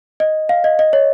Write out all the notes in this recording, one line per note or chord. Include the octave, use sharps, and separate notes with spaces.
D#5
F5
D#5
D#5
C#5